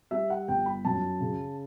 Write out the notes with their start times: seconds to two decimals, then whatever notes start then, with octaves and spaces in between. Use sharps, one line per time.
0.11 G3 E5
0.30 F#5
0.48 G1 G5
0.66 B5
0.85 F#2 A5
1.20 C#3